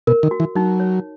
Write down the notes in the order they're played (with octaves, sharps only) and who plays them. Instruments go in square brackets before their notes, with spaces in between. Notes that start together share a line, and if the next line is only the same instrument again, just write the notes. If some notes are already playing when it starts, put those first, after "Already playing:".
[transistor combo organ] B2 [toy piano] A#4
[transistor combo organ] D#3
[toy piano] F#4
[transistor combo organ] E3
[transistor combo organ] F#3 [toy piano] D#4
[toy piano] C#5